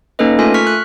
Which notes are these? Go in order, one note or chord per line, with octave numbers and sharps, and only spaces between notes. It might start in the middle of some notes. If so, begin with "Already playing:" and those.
A#3 C#4 D#4 A4 B4 D#5
A3 F4 A4 A#4 G#5
C#6 F6 B6
F#6